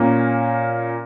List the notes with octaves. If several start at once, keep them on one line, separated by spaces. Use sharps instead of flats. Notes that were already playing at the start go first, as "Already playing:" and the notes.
Already playing: A#2 A#3 C#4